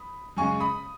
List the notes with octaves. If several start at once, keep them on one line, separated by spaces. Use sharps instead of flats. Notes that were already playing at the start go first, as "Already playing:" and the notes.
Already playing: B5 D#6
F#2 C#3 G#3 G#5 C#6
B5 D#6